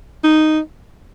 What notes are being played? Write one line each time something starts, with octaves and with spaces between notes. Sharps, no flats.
D#4